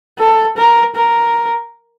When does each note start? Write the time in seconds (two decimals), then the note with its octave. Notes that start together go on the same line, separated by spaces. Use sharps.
0.19 A4
0.57 A#4
0.96 A#4